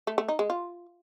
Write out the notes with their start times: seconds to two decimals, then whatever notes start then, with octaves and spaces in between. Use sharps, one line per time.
0.07 A3
0.18 A3
0.28 D#4
0.39 G#3
0.50 F4